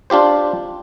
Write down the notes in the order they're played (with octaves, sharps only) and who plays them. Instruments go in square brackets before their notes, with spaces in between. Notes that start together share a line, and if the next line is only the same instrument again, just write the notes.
[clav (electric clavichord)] D4 F4 G4 C5